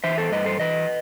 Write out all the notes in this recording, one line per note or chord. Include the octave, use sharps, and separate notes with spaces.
E3 C5 E5
A4 C5
G2 B4 D#5
A4 C5
E3 B4 D#5